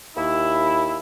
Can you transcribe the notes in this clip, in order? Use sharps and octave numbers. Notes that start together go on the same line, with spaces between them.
D#2 E4